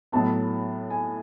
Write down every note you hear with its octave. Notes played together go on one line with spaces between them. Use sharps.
A2 F#3 B3 A5
G#5